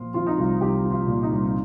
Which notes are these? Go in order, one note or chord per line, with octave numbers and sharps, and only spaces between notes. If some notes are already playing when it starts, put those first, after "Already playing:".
Already playing: A#2 F3 F4
F3 F4
D#4
C2 F4
C2 D#4 G4
F3
F4
A#2
D#4
C2
D#4